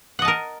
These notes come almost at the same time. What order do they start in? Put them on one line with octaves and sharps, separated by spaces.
F#5 D#5 A5 A#4